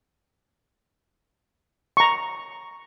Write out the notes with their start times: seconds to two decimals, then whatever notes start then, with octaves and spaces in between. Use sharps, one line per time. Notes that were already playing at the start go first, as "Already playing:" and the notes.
1.97 A#5 C#6